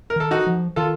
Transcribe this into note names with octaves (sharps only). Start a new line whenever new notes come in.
A#4
D#3 A4
D#4 F#4
F3
D#3 F4 A4